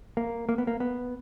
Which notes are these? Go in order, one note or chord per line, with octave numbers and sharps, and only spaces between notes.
A#3
A#3
B3
A#3
B3